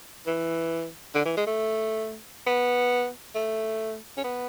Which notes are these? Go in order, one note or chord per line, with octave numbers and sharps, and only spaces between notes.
E3
D3
E3
G#3
A3
B3
A3
C#4
B3